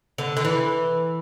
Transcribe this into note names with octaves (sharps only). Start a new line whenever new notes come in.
D3
D3
E3